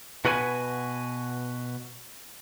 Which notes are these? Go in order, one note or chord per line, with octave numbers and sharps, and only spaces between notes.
B2 F#4 B4 D#5 G#5